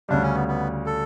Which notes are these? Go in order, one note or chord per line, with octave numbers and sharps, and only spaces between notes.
D2 C#3 G3 D4
C#4
B3
B3
A4